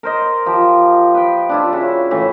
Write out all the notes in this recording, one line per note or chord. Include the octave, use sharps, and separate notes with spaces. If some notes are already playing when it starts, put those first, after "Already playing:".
A#4 C5 D#5
F3 G4
B4 G5
D4 E4 F4
C#3 F#4 E5
A2 C#3 E3